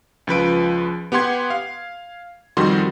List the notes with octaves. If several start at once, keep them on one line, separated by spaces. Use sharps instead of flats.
C#2 F3 B4 D7
B3 G4 F#5 C6 G#6
F5
F2 D#3 G3 F#4 C6